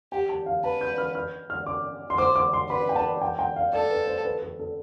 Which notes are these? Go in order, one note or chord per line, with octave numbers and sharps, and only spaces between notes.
G4 G5
A5
F5
B4 A5
G6
F6
F6
F6
D6
C6
C5 D6
D6
C6
B4 B5
G5
A5
G5
G5
F5
A4 D5
B4
C5
B4
A4
A4